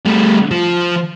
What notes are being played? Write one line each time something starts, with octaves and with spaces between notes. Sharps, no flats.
G3 A3
F3